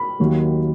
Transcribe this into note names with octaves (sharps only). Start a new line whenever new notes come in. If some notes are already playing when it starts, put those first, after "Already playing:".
Already playing: B5
D#2 D#3 F#3 A#3